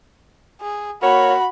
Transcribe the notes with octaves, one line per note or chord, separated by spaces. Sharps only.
G#4
A#3 F#4 A#4 C#5 B5